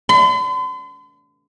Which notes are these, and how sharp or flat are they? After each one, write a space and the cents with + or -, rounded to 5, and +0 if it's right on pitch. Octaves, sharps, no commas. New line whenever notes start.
C6 -45